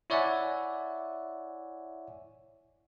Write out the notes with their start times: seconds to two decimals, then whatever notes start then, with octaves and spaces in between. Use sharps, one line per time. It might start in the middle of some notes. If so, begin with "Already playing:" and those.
0.10 E4 C#5 D5 E5 F#5 G#5